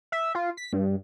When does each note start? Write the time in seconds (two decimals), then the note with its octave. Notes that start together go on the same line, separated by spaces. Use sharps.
0.12 E5
0.35 F4
0.57 B6
0.73 G2